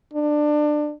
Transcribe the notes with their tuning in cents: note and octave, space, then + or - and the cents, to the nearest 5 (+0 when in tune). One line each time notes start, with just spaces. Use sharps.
D4 +20